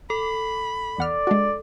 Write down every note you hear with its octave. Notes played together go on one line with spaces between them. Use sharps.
A4 B5
E2 D5 F#5 F6
G#3 D4 F#4